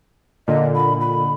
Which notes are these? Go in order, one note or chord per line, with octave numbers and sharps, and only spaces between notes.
A#2 D3 D#5
B5
B5